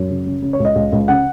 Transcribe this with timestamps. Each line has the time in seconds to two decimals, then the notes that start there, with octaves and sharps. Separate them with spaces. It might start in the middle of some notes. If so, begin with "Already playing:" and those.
Already playing: F#2
0.10 C#3
0.26 C#3
0.42 C#3
0.53 C#5
0.60 C#2
0.65 D#5
0.76 C#2
0.92 C#2
1.08 C#3 F#5